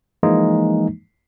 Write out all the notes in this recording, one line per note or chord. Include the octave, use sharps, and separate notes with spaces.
E3 F3 G#3 A#3 D#4